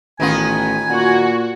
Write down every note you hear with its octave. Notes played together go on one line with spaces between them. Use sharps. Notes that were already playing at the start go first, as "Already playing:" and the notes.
A1 D#3 B3 F4 G#5
A#2 F#4